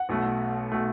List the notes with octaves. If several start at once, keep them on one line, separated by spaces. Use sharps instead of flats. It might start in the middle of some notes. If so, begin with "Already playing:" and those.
Already playing: F#5
B1 B2 A3
B2 A3